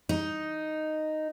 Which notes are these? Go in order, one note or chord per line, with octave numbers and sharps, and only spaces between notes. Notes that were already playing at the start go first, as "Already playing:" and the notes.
D#4